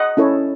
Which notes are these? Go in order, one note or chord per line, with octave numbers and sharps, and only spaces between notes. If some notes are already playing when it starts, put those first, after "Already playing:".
Already playing: D#5 F#5
C#4 E4 A4 C#5